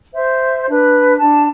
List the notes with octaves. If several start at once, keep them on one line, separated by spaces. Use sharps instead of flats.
C5 E5
D4 B4
D4 A5